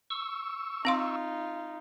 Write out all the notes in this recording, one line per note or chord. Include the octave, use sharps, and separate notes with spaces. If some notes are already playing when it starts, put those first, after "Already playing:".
C#6 E6
C4 D#4 F4 F5 C6